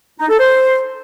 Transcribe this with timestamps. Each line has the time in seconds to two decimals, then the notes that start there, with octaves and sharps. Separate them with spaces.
0.19 D#4
0.29 A4
0.40 C5